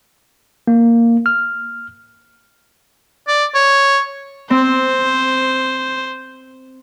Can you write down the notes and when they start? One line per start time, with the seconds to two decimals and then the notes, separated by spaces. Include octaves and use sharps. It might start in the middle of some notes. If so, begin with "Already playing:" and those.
0.68 A#3
1.26 F6
3.28 D5
3.55 C#5
4.50 C4 C5